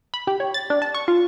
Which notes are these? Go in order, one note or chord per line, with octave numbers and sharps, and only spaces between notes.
B5
G4
C#5
A6
D4
A5
C#6
F4